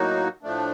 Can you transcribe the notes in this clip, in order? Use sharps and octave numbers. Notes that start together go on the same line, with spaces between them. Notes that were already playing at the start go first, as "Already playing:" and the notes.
Already playing: A2 F#3 A#3 D#4 F#4
A2 F3 A3 D4